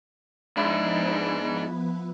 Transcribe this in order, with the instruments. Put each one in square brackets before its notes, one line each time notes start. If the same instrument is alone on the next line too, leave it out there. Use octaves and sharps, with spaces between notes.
[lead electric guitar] G#2 [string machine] F3 B3 B4 [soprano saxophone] D4 [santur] E4 B5